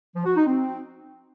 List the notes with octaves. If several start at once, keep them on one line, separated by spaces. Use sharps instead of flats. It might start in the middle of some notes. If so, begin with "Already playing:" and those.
F3
F#4
D#4
C4